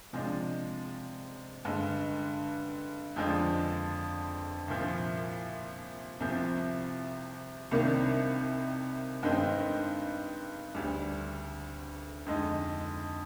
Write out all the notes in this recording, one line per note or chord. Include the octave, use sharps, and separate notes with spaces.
C3 F3 G#3 D4
G2 D3 G#3
F2 D3 F3 G#3 D4
C2 A#2 F3
C2 C3 F3
C2 C3 D#3 A#3 D4
G2 D#3 G#3 C4 D#4
D2 D3 G3
F2 D3 G#3 D#4